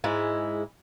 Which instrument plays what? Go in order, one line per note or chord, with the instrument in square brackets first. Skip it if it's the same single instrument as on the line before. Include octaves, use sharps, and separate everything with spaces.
[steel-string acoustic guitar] G#2 G#3 E4